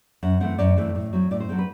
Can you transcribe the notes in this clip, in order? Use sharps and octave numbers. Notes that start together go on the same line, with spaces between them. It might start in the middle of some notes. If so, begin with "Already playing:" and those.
F#2 F#5
E3 A3 C4 F#5
F#2 D5
E3 A3 C4
A2
F#3 C4
A2 D5
C5
F#3 C4 A4
B4